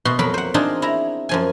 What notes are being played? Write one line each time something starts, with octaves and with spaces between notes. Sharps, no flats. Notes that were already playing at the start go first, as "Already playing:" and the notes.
B2 F#4 C6
F2 F#3 F#4 A#4 B5
C5 F#5
C4 D4 D#4 F4 G#4
E4 A#5
F#2 F3 G#5